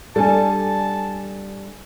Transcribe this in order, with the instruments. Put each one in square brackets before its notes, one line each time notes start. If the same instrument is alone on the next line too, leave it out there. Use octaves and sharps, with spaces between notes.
[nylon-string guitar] G3 D4 [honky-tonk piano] A4 G#5 [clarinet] A5